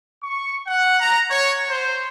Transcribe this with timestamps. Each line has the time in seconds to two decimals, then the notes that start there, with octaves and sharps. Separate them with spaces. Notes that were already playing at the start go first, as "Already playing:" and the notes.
0.23 C#6
0.67 F#5
1.00 A#5
1.30 C#5
1.69 C5